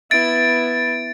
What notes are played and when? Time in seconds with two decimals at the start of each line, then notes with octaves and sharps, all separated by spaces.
0.11 B3 E4 A6 D7